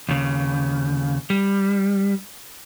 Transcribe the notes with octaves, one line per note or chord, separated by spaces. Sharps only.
D#2 C#3
G3